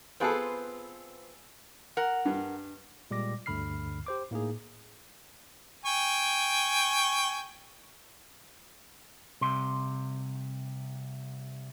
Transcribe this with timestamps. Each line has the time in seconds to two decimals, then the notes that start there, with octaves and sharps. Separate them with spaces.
0.20 B3 C4 F4 G#4 A4 B4
1.97 A#4 F#5
2.25 G2
3.11 A#2 G3 G#3 D6 A#6
3.46 D2 G2 D3 B5 F6 C7
4.06 G4 C5 D6
4.31 A2 A#3 D#4 G#4
5.85 G5 G#5 C#6
9.41 C2 C3 C6